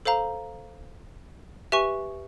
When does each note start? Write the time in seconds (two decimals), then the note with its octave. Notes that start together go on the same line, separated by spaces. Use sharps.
0.05 A4 C5 F5 A#5
1.72 G4 B4 E5 G#5 C#6